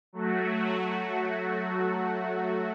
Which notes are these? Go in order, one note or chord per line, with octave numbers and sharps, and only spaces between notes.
F#3 A3 F#4